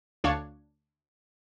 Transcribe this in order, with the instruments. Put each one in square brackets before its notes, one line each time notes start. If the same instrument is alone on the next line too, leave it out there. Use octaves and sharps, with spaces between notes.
[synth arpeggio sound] D2 D4 C#5 F5 C#6 G#6